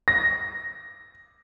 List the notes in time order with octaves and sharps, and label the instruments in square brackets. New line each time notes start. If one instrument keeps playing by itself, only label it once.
[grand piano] A#6